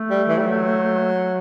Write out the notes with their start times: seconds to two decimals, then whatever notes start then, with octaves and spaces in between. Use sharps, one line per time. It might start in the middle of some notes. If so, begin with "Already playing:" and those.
Already playing: A3
0.10 G3
0.28 E3
0.38 G3
0.46 F#3